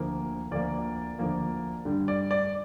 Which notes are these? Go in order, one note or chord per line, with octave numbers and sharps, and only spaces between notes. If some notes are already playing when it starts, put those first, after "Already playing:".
Already playing: D2 D3 F3 A#3
D2 D3 F3 A#3 D5
D2 D3 F3 A#3
G2 D3 G3
D5
D5